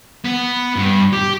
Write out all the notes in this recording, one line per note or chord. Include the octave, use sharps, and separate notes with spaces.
B3
G2
G4